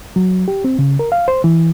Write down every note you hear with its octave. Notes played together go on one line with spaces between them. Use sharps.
F#3
G4
C4
C#3
A#4
F5
C5
E3